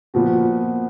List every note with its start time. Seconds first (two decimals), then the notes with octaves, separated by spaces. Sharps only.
0.14 A#2 F3 B3 F#4